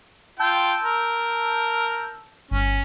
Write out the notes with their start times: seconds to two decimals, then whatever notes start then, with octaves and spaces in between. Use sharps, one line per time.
0.39 F4 G5 A5 E6 G6
0.83 A#4
2.51 G1 C#4